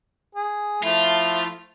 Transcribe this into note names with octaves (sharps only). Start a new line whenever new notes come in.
G#4
F3 A3 E4 F4